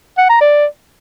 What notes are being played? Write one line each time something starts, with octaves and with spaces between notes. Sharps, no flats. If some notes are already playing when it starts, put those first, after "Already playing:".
F#5
A#5
D5